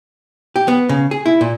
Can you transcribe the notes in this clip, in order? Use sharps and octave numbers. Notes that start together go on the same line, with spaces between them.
G4
B3
C#3
G#4
E4
A#2